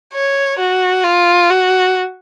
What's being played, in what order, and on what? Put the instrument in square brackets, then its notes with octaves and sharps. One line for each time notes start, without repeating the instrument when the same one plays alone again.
[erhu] C#5
F#4
F4
F#4